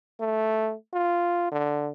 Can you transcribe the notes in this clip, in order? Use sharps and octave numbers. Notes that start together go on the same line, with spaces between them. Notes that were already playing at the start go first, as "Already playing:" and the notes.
A3
F4
D3